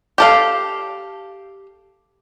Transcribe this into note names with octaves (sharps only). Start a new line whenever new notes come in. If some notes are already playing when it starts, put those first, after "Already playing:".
G4 A4 F5